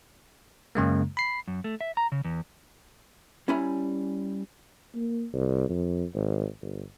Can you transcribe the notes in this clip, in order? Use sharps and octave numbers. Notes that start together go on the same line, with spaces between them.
F#2 C#3 G#3 A#3
B5 C7
F#2
A3
E5
A#5
C#3
E2
G3 C#4 E4 G#5 A#5 B5
A#3
C2
F2
G#1
G1